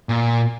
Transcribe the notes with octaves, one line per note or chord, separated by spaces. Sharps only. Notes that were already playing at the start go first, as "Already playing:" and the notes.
A#2